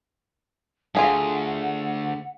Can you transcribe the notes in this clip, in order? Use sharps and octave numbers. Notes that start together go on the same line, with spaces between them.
D2 G2 F4 G#4 A4 F#5